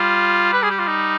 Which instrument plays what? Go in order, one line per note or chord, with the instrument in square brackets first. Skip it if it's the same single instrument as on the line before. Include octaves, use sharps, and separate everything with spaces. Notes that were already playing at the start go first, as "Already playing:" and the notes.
Already playing: [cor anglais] G3 [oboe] F4
[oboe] B4
G#4
G4
F4
D#4